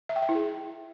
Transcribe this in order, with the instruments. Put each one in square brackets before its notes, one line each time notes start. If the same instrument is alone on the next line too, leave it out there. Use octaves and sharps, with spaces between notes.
[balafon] E5
G5
E5
E4
G#4